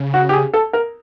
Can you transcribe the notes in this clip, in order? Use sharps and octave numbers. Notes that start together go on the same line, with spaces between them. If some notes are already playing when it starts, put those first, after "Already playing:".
Already playing: C#3
F#4
G4
G#4
A4
A#4